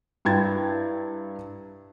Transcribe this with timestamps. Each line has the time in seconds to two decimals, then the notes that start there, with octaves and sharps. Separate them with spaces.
0.25 G2 E4 G5 A#5 G#6 A6